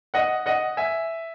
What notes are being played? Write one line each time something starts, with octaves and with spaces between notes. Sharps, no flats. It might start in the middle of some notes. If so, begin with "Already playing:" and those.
D#5 F#5
D#5 F#5
E5 G#5